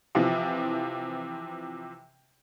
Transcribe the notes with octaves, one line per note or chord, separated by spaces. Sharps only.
C3 E3 F3